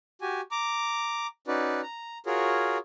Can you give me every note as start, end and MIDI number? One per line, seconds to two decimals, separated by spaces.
0.21 0.41 66
0.21 0.41 67
0.21 0.41 80
0.51 1.27 82
0.51 1.27 86
1.47 1.81 61
1.47 1.81 63
1.47 1.81 66
1.47 1.81 71
1.47 1.81 74
1.83 2.18 82
2.26 2.78 65
2.26 2.78 66
2.26 2.78 68
2.26 2.78 70
2.26 2.78 73